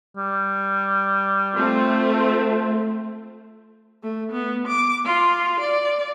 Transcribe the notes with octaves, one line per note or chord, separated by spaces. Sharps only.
G3
A3 C4 F4
A3
B3
D6
F4
D5